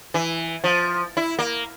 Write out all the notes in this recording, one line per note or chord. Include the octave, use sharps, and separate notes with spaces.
E3
F3
E4
A#3